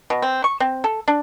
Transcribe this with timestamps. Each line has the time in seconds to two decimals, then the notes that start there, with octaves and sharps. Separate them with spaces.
0.10 B2
0.22 C4
0.44 C#6
0.60 C4
0.84 A4
1.08 D4